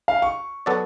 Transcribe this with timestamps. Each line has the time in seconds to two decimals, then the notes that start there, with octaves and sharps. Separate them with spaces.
0.08 F5
0.22 C#6
0.66 F#3 B3 F#4 A4 D5